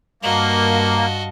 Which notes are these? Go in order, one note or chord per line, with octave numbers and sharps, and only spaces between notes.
G2 A#3 F#4 D#5 F5 A5